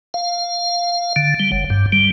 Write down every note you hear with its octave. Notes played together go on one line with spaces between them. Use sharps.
F5
D3
G3
F#1
G2
G3